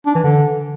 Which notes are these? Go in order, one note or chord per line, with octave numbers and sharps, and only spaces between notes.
D4
E3
D3